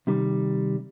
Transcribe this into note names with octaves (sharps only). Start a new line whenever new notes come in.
C3 D#3 G3